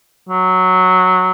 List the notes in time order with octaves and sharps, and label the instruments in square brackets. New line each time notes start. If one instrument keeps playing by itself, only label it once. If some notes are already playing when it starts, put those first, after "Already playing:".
[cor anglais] F#3